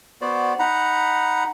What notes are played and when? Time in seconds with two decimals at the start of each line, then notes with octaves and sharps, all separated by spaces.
0.21 B3 F#4 C5 D5
0.59 D#4 F#5 A#5 B5